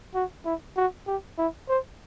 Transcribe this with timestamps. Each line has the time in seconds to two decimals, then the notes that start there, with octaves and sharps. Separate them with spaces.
0.15 F#4
0.45 E4
0.77 F#4
1.07 G4
1.38 E4
1.69 C5